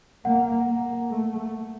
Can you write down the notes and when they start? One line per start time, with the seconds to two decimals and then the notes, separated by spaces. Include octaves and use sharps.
0.25 A#3 F#5
0.67 A#3
1.10 A3